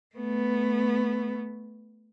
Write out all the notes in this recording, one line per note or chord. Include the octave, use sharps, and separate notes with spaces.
A3 B3